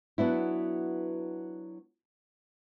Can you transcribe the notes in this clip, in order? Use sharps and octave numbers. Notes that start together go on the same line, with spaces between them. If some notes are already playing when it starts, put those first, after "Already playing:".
F#3 B3 D4 E4